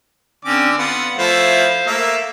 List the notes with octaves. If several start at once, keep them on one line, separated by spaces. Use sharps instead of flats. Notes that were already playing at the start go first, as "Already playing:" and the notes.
D3 C4 C#4 D5 D6
B3 F4 F#5
F3 A3 E4 C5 F5
A3 A#3 E5